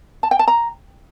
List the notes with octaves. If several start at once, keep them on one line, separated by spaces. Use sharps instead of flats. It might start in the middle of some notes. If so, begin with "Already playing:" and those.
A5
G5
A5
A#5